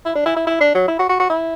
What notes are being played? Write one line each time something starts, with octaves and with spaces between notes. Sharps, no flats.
E4
D4
E4
E4
E4
D4
F#3
E4
F#4
F#4
F#4
E4